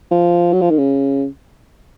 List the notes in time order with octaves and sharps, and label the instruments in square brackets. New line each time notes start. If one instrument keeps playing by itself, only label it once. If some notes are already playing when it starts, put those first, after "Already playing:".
[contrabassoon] F3
F#3
F3
D#3
C#3